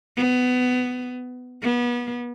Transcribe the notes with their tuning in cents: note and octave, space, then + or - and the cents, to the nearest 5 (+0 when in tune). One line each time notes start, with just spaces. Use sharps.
B3 +20
B3 -30